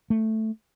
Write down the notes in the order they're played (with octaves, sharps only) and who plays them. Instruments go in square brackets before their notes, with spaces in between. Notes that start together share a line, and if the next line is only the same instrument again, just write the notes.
[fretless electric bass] A3